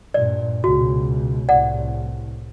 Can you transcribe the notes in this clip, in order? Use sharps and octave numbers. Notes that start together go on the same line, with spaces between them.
G2 A#2 D5
C#2 B2 F#4
C2 A2 D5 F#5